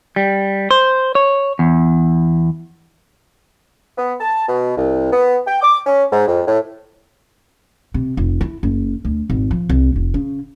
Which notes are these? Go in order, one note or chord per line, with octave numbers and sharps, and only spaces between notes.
G3
C5
C#5
E2
B3
A5
B2
C2
B3
G5
D6
C#4
G#2
F2
A2
C3
F1
E4
F#1
D2
G#1
F3
C2
F1
C#3